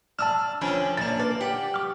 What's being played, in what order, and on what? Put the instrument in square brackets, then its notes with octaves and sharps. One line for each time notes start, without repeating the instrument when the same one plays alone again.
[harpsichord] D4 [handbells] A5 E6 F6
[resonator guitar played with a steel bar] F2 C#4 D4 [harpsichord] F3 B4 G5
[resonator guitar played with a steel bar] F#2 [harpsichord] A#2 D4 [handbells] A6
[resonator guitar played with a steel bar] A#3 [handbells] B4 [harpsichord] D5
[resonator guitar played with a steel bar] G4 [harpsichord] F#5
[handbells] D6 F6